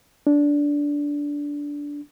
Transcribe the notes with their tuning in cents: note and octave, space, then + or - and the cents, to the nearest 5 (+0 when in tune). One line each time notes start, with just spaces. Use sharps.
D4 -15